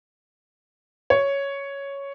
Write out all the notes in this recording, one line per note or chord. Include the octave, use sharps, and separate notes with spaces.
C#5